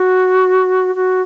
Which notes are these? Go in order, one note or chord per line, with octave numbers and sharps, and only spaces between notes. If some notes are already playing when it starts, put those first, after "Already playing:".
Already playing: F#4
F#4